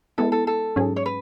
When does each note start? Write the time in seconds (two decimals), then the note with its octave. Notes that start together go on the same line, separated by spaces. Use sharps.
0.18 G#3 B3 E4 A4
0.32 A4
0.47 A4
0.76 G#2 F#3 C#4 G#4
0.96 C#5
1.06 B4